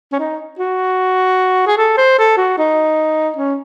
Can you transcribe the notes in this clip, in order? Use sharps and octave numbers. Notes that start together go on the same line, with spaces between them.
C#4
D#4
F#4
G#4
A4
C5
A4
F#4
D#4
C#4